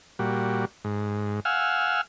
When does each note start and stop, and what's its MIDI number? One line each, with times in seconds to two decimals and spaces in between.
0.19 0.65 46
0.19 0.65 55
0.19 0.65 66
0.84 1.40 44
1.45 2.01 77
1.45 2.01 78
1.45 2.01 80
1.45 2.01 88
1.45 2.01 89